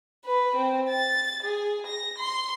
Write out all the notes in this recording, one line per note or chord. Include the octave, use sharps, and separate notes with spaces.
B4
C4
A6
G#4
A#6
C6